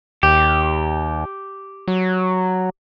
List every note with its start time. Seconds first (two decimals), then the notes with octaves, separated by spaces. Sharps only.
0.23 D#2 G4
1.88 F#3